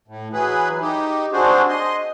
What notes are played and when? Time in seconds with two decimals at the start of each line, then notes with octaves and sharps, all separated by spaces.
0.08 A2
0.33 E3 F#3 G#4 B4
0.81 D#4 G4
1.33 C4 D4 F#4 G#4 C5
1.69 D#5 C6